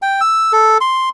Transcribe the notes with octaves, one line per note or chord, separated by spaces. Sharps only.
G5
E6
A4
C6